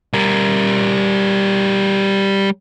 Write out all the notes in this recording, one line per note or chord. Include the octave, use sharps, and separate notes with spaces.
G3 A#4